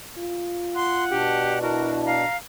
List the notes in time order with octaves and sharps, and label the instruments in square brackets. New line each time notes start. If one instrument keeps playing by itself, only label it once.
[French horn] F4
[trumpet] F#5 [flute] C6
[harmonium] B2 D4 [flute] G4
[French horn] E4 [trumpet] F#4 [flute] A#4
[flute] F5 [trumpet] A#5